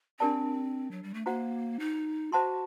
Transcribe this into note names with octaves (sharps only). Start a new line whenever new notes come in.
C4 D4 G4 A#4 D5 A5
F#3
G3
A3
A#3 F#4 C5 F#5 A#5
D#4
F#4 C5 F#5 A5 C6